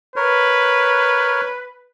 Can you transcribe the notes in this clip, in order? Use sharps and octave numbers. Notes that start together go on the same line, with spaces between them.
A#4 B4 C#5